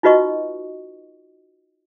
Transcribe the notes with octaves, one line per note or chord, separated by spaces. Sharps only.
D#4 F4 F#4 B4 D#5 C#6